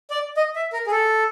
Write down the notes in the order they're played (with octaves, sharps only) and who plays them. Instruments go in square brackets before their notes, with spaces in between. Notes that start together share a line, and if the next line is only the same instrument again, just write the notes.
[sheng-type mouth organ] D5
D#5
E5
A#4
G#4
A4